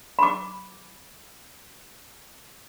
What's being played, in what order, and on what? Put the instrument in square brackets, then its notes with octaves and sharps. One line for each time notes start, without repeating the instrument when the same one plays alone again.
[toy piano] B5 D6